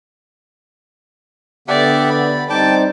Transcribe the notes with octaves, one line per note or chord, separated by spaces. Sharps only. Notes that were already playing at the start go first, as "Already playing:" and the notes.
D3 B3 G4 D5 E5 F#5
D5 B5
G3 C4 D#4 D5 G5 A5 D6